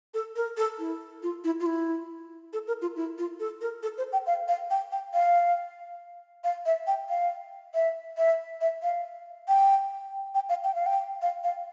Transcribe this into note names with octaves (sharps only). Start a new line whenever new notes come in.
A4
A#4
A4
E4
F4
E4
F4
E4
A4
A#4
F4
E4
F4
A4
A#4
A4
C5
G5
F5
F5
G5
G5
F5
F5
E5
G5
F5
E5
E5
E5
F5
G5
G5
F5
G5
F5
G5
F5
F5